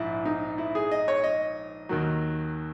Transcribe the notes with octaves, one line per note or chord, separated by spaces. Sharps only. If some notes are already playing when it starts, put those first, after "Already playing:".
Already playing: A#1 G#2 E4
D#4
E4
G#4
D#5
C#5
D#5
D#2 D#3 F#3